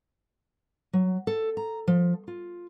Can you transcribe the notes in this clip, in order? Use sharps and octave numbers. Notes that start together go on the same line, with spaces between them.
F#3
A4
A#5
F3
F4